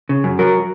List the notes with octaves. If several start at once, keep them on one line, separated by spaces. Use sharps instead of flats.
C#3
F#2
F#3 A#4